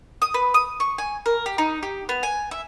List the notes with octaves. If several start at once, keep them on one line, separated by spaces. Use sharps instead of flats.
D#6
B4
D#6
C#6
G#5
A#4
G4
D#4
G4
B3
G#5
E5